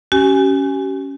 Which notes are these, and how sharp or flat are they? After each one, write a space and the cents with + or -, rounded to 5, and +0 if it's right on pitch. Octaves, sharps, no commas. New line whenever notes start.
C#4 +0 G4 -40 G#5 +0